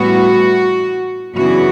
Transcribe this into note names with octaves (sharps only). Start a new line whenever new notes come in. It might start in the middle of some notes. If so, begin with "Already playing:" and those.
Already playing: A2 E3 G3 B3 F#4
F#2 C#3 E3 B3 D4 F#4